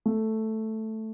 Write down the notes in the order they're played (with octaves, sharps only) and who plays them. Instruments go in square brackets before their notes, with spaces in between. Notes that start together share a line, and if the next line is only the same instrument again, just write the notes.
[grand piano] A3